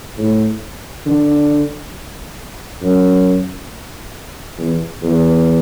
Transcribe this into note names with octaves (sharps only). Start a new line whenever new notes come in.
A2
D3
F#2
E2
E2